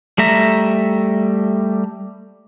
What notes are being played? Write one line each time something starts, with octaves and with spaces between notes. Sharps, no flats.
G3 A3 E5 A#5